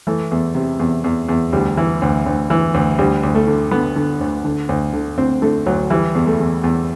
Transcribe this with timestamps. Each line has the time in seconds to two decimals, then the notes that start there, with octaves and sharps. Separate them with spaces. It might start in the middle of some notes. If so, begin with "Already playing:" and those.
0.07 E3 A3
0.31 E2
0.55 C3
0.80 E2
1.04 E2
1.29 E2
1.53 D2 G3
1.77 E3
2.02 D2
2.26 D2
2.50 E3
2.74 D2
2.98 D2 G3
3.23 D2
3.35 A3
3.47 D3
3.71 D3 B3
3.96 D3
4.21 D2
4.45 D3
4.69 D2
4.93 D3
5.17 D2 C4
5.42 D3 A3
5.66 D2 F#3
5.90 E3 G3
6.15 E2
6.27 A3
6.39 E2
6.64 E2